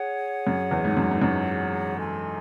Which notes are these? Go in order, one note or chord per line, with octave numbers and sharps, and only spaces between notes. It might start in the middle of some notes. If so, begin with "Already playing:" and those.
Already playing: G#4 C#5 F#5
F#2
E2
G#2
F#2
G#2
F#2
A4 D#5 G#5 C6